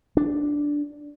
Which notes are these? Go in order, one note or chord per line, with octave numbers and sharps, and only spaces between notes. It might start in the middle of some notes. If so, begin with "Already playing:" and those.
D4